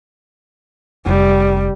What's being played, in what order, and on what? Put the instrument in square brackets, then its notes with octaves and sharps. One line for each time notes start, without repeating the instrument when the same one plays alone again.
[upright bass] F1 [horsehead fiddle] G3